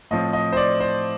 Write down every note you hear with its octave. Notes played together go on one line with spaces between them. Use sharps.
A2 F3 C4 D#5
D#5
C5
D5
C5